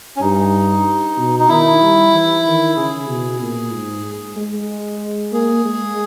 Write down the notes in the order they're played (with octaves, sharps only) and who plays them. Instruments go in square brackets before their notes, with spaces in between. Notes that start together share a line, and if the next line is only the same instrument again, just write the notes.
[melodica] C#4
[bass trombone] G2 [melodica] D#4
[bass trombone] B2
[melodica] D#4
[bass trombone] D#3 [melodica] E4
[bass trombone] G3
E3
D#3
[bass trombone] C#3 [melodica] G#4
[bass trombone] B2
A#2
G#2
G#3
[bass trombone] A#3 [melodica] G#4
[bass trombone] G#3